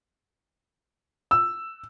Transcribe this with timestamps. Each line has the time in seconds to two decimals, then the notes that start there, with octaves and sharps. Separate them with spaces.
1.31 E6